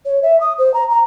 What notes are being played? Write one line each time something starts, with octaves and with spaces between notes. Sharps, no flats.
C#5
E5
D#6
C5
A#5
A#5